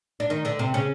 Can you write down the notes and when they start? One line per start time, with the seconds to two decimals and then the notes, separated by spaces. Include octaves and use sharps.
0.20 D4
0.30 D#3 D#4
0.45 D3 D4
0.59 C3 C4
0.74 C#3 C#4